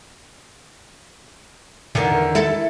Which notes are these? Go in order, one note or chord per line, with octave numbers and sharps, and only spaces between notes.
E2 D3 D#3
E4 A4